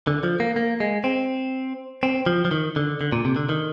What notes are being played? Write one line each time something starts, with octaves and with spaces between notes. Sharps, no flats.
D3
F3
A#3
A#3
G#3
C4
C4
F3
F3
D#3
D3
D3
A#2
C3
D3
D#3